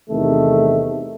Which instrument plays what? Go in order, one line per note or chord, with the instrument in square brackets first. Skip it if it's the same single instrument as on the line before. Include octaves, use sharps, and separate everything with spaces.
[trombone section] E2 C3 D#3 A3